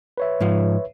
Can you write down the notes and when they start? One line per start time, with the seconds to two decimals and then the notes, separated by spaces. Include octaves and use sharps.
0.18 B4 C#5 E5
0.40 G#2 F3